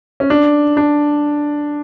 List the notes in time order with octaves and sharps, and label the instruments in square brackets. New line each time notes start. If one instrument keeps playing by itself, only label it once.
[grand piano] C#4
D4
D4